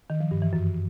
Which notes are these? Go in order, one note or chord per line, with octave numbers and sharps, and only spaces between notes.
D#3
F3
G2
E3
F#2